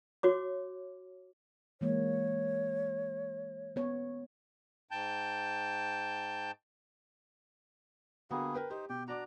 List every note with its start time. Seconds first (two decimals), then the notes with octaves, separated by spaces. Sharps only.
0.23 F#4 C#5 D6
1.81 E3 G#3 A#3 C#5
3.76 B3 C#5
4.91 G#2 G5 A5 G6
8.31 D3 G3 A#3 B3 F#4 G#4
8.54 A#4 B4 G5
8.70 D#4 G4 C5
8.89 B2 G4 G5
9.08 D4 F#4 D5 A#5 D6